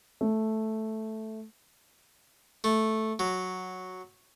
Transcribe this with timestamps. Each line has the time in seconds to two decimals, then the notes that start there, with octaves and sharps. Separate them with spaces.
0.21 A3
2.64 A3
3.19 F#3